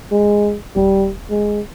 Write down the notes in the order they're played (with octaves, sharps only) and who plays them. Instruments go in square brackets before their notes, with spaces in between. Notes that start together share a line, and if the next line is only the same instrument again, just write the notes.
[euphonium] G#3
[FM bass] D#1 [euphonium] G3
[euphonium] G#3